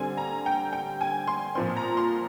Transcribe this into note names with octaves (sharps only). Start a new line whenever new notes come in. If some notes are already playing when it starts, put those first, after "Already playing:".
Already playing: D3 G3 C4 G#5
A#5
G5
G5
G#5
C6
A#2 F3 C4 C6
A#5
C6